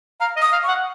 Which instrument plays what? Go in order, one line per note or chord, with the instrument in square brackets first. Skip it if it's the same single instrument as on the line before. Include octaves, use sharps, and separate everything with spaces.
[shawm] F5 [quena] A#5
[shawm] D#5
[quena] D#6
[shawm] F5
[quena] C#6
[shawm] F#5